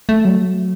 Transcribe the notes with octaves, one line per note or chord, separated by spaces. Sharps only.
A3
F#3